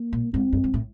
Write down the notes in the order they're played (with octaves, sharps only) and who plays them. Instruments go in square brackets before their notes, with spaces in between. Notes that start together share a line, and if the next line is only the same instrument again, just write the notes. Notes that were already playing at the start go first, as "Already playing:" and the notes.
Already playing: [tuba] A#3
[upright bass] A#2
[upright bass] G#2 [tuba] C4
[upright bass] G2
G2
A2